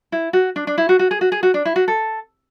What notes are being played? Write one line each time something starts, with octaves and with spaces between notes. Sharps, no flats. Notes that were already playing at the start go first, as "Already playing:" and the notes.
E4
F#4
D4
D4
E4
F#4
F#4
G#4
F#4
G#4
F#4
D4
E4
F#4
A4